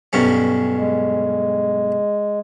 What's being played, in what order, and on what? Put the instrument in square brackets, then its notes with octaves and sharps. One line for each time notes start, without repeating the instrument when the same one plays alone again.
[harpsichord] B1 G2 C#4
[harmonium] G#3